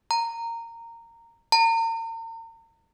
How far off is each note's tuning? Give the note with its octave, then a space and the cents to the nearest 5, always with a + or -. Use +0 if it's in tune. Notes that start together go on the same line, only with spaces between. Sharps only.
A#5 -15
A#5 -40